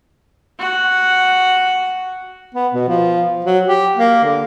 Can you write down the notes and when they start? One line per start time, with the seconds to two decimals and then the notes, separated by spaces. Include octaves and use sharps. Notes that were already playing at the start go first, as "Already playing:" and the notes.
0.59 F#4 F#5
2.55 B3
2.74 B2
2.88 F3
3.45 F#3
3.67 G4
3.97 A#3
4.24 D3